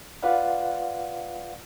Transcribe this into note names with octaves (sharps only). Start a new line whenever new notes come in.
F4 B4 D5 F5 F#5